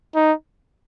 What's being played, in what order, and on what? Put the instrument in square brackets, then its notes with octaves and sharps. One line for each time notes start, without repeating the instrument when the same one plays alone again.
[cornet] D#4